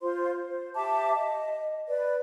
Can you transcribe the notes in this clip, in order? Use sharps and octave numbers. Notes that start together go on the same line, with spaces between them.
F4 C5 C6
C5
G4 E5 A5 D6
D#5
B4 D5